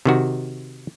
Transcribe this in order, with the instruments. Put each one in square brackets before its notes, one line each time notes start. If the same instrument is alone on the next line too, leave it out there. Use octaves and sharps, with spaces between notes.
[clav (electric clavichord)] C3 D#3 F#4